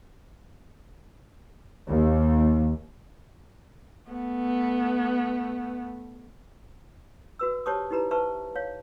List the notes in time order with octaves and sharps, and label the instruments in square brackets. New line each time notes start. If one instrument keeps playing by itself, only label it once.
[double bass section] D#2
[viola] A3 B3
[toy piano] F#4 B4 E6
G4 C5 C#5 A5 C#6 D#6
D#4 E4 G4 B4 A#5 B5
B4 C5 E5 A5 C#6
C#5 F5